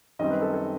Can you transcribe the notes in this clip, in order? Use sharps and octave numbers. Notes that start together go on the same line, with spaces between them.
F#2 D#3 G3 C4 D#5
B4
A4
A4